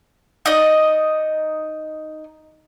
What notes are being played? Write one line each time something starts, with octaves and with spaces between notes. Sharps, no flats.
D#4 D5 D#5